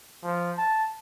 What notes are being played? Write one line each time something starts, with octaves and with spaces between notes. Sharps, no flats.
F3
A5